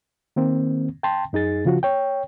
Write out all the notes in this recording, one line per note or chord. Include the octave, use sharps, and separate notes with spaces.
D#3 A#3 C4
G5 A5 C6
F#2 D#4 G#4 A6
C#3 F3 F4 F#4
C#5 G5